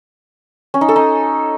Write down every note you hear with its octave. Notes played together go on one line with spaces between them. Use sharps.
C#4
D#4
A4
D#4